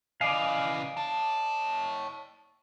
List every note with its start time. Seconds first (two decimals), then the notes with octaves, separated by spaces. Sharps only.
0.21 C#3 E3 D5 D#5 F5
0.97 C#5 A5